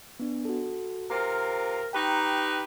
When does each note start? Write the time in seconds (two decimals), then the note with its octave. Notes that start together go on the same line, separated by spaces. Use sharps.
0.19 B3 D4
0.45 F#4 A4
1.10 C3 F4 A#4 A#5
1.93 D#4 G4 B4 G5 A#5 C#6